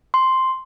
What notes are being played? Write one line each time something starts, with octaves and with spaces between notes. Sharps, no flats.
C6